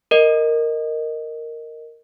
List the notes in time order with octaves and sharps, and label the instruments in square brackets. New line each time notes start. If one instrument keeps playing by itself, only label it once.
[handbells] A#4 D#5